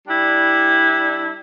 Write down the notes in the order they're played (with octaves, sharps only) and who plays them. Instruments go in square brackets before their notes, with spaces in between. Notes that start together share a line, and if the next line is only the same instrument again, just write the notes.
[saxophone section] G3 D4 E4